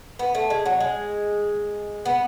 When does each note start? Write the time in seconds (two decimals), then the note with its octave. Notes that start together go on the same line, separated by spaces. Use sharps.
0.19 B3
0.35 A3
0.50 G#3
0.66 F#3
0.80 G#3
2.05 B3